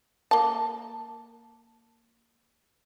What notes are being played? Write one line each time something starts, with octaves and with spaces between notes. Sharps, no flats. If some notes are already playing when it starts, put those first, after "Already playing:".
A#3 A5